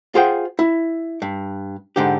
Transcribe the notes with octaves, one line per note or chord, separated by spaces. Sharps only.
F4 G#4 C5 F#5 G5
E4
G2
G#2 D3 G4